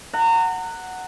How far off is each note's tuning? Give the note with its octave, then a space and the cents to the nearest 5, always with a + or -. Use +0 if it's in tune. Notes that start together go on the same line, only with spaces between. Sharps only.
F#5 +0 A#5 -30